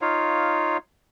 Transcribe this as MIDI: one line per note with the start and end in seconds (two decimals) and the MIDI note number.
0.02 0.77 63
0.02 0.77 65
0.02 0.77 73
0.02 0.77 77